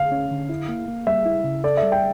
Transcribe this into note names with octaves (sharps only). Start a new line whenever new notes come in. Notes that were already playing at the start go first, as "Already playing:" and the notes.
Already playing: D3 F5
C#4
D3
E4
A#3
A#3
G3 E5
E4
C#3
A4 D5
E5
G3
G5